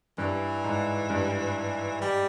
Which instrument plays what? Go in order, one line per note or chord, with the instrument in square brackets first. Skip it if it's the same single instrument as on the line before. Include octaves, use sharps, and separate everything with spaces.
[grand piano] G2 [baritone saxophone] E3
[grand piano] G#2
G2
[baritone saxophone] G3